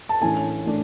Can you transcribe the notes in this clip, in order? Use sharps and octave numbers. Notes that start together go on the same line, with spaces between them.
A5
A1 A2 E3 A3 D4 G#5
A2 E3 A3 D4